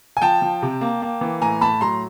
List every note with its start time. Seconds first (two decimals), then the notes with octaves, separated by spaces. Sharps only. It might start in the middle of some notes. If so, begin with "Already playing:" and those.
0.17 G#5
0.21 F3 G5 A5
0.42 F3
0.62 C3
0.81 A#3
1.02 A#3
1.21 E3
1.41 A2 G#5 A#5
1.61 A2 A5 B5
1.81 F#3 A#5 C6